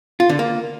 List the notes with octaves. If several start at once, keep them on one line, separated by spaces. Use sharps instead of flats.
F4
D3
A#3